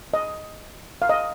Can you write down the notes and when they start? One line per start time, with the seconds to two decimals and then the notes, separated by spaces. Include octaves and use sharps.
0.14 D#5
1.02 F5
1.09 D#5